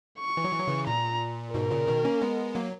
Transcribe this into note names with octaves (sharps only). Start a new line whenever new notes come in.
C#6
E3
F#3
E3
F#3
C#3 E3
A#2 A#5
G#2 B2 A#4
A#2 C#3
B2 D#3
A#3 C#4
G#3 B3
F#3 A#3